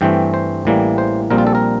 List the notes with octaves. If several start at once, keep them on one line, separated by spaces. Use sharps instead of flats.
G2 E3 A3 C4 G5
C5
A1 A2 E3 G3 A#3
C5
A#1 A#2 G3 C4 A#4
F4
A4
A#4